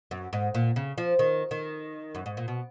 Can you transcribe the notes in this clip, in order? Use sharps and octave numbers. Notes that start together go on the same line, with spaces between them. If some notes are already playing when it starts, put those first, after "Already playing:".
F#2
G#2
A#2
C#3
F3
D#3
D#3
F#2
G#2
A#2
B2